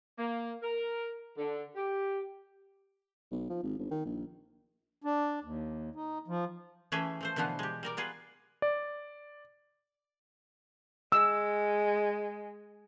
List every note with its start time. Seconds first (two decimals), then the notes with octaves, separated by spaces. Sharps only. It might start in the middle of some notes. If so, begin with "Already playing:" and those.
0.18 A#3
0.63 A#4
1.38 D3
1.76 G4
3.31 B1
3.49 F3
3.63 G#1
3.79 G1
3.91 D#3
4.05 A#1
5.04 D4
5.44 D#2
5.96 D#4
6.28 F3
6.92 E3 A3 C#4 G#4 E5
7.21 F3 A3 C5
7.36 B2 D3 E3 F3 B3
7.59 G#3 G4
7.83 G3 A#4 D5
7.97 B3 F4 G#4 B4
8.62 D5
11.12 G#3 E6